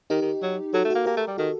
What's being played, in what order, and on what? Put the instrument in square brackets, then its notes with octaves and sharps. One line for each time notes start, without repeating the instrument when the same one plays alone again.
[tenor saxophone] D#3 [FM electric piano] D#4 G4
[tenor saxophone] D#3
F#3
[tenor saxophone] F#3 [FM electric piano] F#4 A4
[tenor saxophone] A3
[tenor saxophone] A#3 [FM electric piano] F#4 A4
[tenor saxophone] A#3 [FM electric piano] G4 A#4
[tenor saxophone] A3
G3
[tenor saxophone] D#3 [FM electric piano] F#4 A4